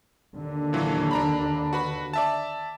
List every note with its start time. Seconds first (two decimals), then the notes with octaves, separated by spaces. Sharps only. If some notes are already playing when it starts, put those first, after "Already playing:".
0.35 D#2 D3
0.73 A#2 E3 F#3
1.11 D4 A#5 B5
1.73 F#4 B4 B5
2.13 D5 E5 A5